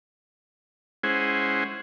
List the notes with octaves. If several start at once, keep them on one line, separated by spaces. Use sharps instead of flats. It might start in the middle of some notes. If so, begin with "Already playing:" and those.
G#3 C#4 E4 G#4 C5 F#5